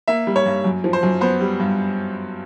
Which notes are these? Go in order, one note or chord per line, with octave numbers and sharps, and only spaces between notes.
A#3 E5
G3
C#5
G2
F#2
F3
C5
F#2
B3 C5
G3
G2